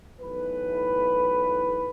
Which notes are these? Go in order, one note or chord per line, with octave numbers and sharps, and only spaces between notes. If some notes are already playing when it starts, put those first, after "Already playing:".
B1 A2 E3 B4